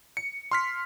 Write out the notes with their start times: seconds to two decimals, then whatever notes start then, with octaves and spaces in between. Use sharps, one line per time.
0.17 C#7
0.51 C6 F6 B6